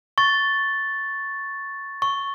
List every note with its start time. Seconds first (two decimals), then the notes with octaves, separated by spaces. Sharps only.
0.18 C#6 A6
2.02 C#6